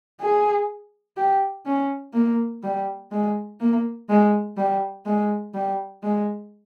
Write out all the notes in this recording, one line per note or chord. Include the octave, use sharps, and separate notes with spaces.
G#4
G4
C#4
A#3
G3
G#3
A#3
G#3
G3
G#3
G3
G#3